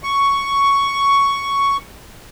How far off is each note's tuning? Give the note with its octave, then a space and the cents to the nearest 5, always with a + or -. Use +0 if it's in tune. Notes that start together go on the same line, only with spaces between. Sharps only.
C#6 +5